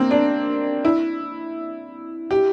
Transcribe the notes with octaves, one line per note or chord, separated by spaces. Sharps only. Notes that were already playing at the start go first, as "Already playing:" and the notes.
Already playing: A#3 C4
D4
E4
G4